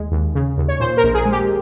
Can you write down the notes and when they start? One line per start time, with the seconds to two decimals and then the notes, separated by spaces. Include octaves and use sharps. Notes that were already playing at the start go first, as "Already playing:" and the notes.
Already playing: D#2 G#3
0.12 D#2
0.35 C#3
0.58 D#2
0.68 C#5
0.80 A#2 C5
0.97 A#4
1.04 A#1
1.14 G#4
1.26 G#3
1.32 G4